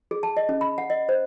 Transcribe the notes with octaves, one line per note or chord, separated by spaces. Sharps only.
G#4
A5
D#5
C#4
B5
F#5
D#5
C5